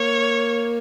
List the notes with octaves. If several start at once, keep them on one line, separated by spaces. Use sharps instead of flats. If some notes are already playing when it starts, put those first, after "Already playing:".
Already playing: A#3 C#5